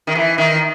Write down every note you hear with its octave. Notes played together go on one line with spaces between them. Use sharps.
D#3
E3
D#3